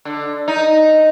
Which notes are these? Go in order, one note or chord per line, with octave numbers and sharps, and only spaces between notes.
D3
D#4